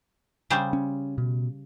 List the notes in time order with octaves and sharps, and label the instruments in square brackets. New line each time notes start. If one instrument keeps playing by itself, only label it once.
[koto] C#3 G3 C5
[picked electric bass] C#4
B2